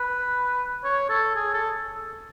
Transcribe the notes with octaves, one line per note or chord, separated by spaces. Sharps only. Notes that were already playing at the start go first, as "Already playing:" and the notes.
Already playing: B4
C#5
A4
G#4
A4